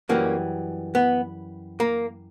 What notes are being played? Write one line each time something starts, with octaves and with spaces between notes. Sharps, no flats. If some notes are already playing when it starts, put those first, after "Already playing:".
F#2 E3 G3 A#3 C#4
B3
A#3